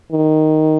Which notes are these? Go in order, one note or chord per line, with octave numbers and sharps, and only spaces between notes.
D#3